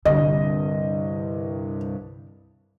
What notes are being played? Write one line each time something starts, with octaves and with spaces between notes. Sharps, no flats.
C2 G2 D3 D#5